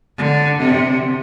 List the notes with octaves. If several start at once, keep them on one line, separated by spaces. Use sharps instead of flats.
D3
C3